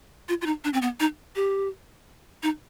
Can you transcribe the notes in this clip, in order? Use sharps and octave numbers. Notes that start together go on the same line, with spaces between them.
F4
F4
D#4
D4
C4
B3
D#4
G4
D#4